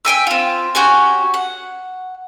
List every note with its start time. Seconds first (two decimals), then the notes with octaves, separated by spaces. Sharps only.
0.05 E5 G5 G#5 E6
0.27 C4 F4
0.75 C#4 F#4 G4 G#5
1.34 F#5